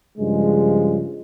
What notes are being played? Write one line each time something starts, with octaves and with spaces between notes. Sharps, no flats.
G2 C#3 F3 G#3